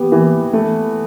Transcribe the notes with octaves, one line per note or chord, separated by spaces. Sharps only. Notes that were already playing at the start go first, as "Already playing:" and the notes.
Already playing: B3 G4
E3
A3